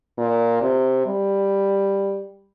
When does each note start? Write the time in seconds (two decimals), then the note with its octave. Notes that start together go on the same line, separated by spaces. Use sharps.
0.18 A#2
0.61 C3
1.06 G3